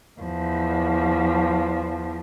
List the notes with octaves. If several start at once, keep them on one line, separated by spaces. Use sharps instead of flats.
E2 F3